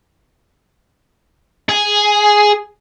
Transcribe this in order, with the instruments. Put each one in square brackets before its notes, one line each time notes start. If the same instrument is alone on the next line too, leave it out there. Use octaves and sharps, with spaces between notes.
[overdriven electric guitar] G#4